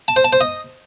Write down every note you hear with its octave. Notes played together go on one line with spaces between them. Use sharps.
A5
C5
A5
C5
D#5